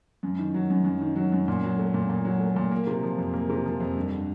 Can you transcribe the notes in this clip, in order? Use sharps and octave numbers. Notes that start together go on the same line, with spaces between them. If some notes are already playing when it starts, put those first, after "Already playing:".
F#2
D#3
F#3
F#2
F#2
D#3
F#3
F#2
A#2
F#3
A3
A#2
A#2
F#3
A3
A#2
A#3
C3
F3
F2
A#3
C3
F3
F2
G2
D3